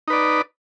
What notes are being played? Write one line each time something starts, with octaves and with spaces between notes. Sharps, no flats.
D#4 B4 D5